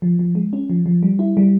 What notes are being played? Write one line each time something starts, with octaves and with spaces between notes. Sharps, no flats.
F3
F3
G#3
C#4
F3
F3
G3
E4
G3